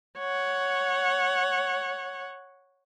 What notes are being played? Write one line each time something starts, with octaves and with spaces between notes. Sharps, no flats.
C#5 F#5